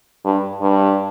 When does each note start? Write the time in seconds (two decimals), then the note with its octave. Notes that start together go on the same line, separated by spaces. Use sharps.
0.24 G2
0.61 G2